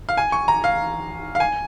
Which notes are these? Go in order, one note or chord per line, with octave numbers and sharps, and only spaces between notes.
F5
G#5
C#6
A#5
F5
F5
G#5